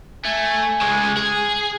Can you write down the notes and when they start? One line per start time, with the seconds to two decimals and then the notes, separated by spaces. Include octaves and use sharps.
0.25 A3 G#5
0.81 C#3 G#3
1.17 G#4